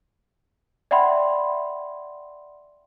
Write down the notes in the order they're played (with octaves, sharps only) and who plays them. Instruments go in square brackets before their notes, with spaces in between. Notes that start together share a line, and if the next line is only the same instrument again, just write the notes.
[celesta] D5 E5 F#5 G5 B5 C6